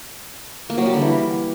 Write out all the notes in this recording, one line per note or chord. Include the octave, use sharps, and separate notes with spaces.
A#3
F#3
G3
D3
E3